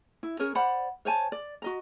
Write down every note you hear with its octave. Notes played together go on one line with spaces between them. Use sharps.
E4
C#4 G#4 A#4 C#5
C5 D5 F#5 B5
C5 C#5 G#5 A5
D5
F#4 D#5 A#5